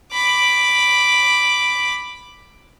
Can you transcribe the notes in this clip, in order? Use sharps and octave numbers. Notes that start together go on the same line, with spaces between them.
B5 D6